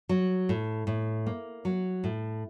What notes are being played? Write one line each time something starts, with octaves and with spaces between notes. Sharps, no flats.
F#3
A2
A2
A#3
F#3
A2